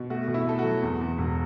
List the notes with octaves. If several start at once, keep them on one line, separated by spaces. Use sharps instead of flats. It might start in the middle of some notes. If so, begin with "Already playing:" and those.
Already playing: B2
A3 F#4
B2
E4
A3 A4
F#4
F#3
E2
E2
E1